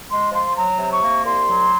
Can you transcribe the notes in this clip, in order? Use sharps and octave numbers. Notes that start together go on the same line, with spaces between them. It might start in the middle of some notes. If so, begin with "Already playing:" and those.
G#3 C6
F3 C6
F#3 A#5
C3
C#6
A#3
C2 C6
F#3